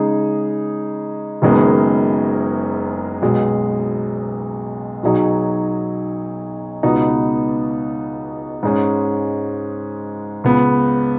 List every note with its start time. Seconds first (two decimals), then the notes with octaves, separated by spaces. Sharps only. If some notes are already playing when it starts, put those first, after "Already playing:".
Already playing: C#3 G#3 D#4 G#4
1.42 F#1 F#2 D#3 G#3 B3
3.22 B1 B2 G#3
5.03 B1 B2 F#3 D#4 G#4
6.83 C#2 B2 B3 D#4
8.63 G#2 G#3 C#4
10.44 C#2 C#3 B3